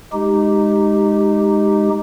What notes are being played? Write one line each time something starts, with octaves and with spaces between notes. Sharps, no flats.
G#3 D#4 G4